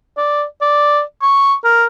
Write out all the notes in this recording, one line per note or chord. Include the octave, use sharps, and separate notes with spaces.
D5
D5
C#6
A#4